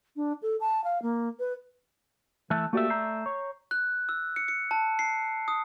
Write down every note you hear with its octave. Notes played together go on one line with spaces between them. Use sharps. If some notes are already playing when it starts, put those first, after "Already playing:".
D4
A4
A5
F5
A#3
B4
E3 A3 E5 A5 F#6
A3 A#3 F#4 G4 D5 E5
A#5 G6 C7
C#5
F#6
E6
C#7
C#7
A5
C7
D#6